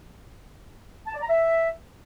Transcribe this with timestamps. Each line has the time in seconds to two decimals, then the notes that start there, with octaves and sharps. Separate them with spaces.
1.06 A5
1.14 D5
1.21 A#5
1.29 E5